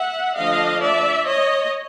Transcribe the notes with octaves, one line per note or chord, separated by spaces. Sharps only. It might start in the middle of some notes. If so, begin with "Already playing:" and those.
Already playing: E5 F#5
D3 F3 A3 D4 D#5 F5
D5 E5
C#5 D#5